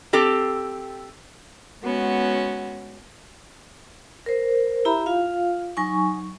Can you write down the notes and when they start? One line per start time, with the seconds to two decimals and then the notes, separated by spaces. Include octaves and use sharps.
0.13 C4 G4 A4
1.84 G#3 B3 C#4 F#4
4.26 A#4 C5
4.85 E4 G4 E5 A#5 B5
5.06 F4 F5
5.77 F#3 D#4 G#5 C#6